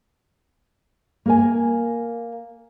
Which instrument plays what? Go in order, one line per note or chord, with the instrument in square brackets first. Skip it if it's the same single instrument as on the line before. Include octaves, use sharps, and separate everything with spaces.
[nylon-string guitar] A#3 A#4 G#5